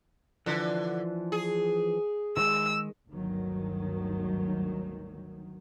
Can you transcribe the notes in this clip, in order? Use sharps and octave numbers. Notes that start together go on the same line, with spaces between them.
D3 E3 F3 F#5
G#4
D#3 G#3 E6
G1 D2 G2 D#3 F#3